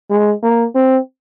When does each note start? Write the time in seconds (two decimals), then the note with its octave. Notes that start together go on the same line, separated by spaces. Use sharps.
0.10 G#3
0.43 A#3
0.75 C4